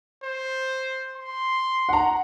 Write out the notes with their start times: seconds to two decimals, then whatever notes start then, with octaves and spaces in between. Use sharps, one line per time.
0.24 C5
1.16 C6
1.89 F#5 A#5